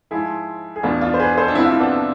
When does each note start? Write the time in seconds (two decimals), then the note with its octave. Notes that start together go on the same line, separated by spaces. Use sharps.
0.11 G#2 F3 E4 G#4
0.76 G#4
0.83 E2 B2 D4 F4
1.01 D4 F4
1.14 C5
1.20 G#4 B4
1.37 A4 C5
1.48 D4
1.55 C2 C3 F3 C4 E4
1.65 F4
1.73 E4
1.80 B3 D4